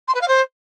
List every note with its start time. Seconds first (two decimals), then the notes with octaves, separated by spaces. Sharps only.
0.07 C6
0.14 B4
0.21 F5
0.28 C5